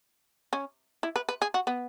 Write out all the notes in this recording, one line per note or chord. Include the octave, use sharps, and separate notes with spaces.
C#4
E4
B4
B4
G#4
F#4
B3